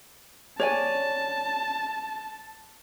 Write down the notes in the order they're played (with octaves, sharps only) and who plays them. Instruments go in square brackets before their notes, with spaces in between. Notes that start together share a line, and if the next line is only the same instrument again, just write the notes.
[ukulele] C#5 D5 G#5 [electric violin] A5